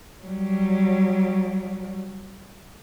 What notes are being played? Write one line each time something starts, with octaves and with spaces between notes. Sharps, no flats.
F#3 G3